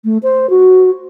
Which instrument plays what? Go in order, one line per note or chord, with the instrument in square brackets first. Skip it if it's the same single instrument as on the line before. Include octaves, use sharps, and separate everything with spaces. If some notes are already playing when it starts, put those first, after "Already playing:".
[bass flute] A3
C5
F#4